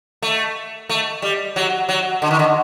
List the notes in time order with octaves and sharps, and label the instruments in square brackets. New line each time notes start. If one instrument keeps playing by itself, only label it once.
[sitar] A3
A3
G3
F#3
F#3
D3
D#3
D3